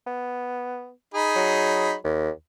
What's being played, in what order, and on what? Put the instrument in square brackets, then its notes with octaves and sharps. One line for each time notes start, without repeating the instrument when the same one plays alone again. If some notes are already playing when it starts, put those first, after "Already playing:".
[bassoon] B3
[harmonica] D#4 G#4 B5
[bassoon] F#3
D#2